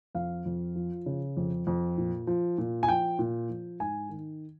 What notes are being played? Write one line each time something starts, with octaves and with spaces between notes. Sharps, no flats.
F2 F5
F2
F3
C#3
F2
F2
A#2
F3
A#2
G#5
F3 G5
A#2
F3
G#2 G#5
D#3